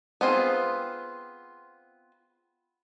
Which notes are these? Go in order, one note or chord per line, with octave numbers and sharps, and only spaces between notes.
B3 C4 F4 G#4